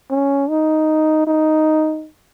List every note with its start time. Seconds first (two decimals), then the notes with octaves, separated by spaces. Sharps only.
0.10 C#4
0.49 D#4
1.27 D#4